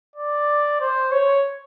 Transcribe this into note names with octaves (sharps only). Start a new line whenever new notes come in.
D5
C5
C#5